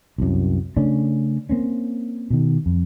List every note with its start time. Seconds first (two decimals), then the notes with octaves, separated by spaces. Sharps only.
0.18 C2 F#2
0.77 C#3 A3 C#4 D4
1.49 A#3 C4 C#4
2.30 B2 D#3
2.66 F2